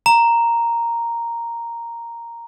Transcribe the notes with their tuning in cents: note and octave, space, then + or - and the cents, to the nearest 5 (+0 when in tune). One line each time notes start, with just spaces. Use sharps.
A#5 -5